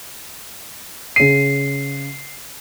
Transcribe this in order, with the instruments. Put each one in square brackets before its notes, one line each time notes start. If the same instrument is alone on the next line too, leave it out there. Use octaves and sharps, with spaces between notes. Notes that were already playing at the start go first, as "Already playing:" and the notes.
[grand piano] C#3 D#7 [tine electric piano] C7